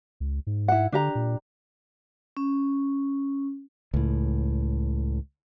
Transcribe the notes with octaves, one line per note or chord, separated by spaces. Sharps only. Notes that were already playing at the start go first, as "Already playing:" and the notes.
C#2
G#2
E4 F#5
D3 D4 G4 A#5
A#2
C#4
C#2 A2